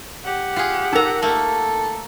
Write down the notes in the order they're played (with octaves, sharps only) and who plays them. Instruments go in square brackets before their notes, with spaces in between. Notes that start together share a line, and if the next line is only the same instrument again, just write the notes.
[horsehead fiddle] G4 F#5
[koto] F4 G#4
[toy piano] D#4 A#4 [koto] A4 A#5
[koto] A3 A#3 [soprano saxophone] A4